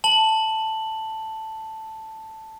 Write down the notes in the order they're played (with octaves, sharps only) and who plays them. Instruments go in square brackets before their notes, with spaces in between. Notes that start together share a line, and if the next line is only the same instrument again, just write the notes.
[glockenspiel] A5 F#7